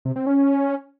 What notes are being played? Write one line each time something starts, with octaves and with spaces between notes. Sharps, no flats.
C3
C4
C#4